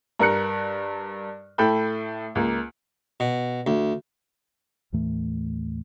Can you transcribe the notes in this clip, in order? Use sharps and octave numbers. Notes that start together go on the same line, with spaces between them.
G2 A#4 F#6 C#7
A2 A4 G5 B5 G6
C#2 A#3
B2
D2
D#2 A2 E3 A3